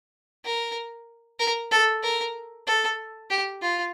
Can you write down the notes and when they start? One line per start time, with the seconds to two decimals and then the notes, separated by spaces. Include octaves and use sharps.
0.45 A#4
1.39 A#4
1.71 A4
2.03 A#4
2.67 A4
3.30 G4
3.62 F4